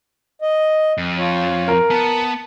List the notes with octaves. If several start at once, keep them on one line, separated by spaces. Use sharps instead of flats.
D#5
F2
F4 C#5
A#4
B3 A5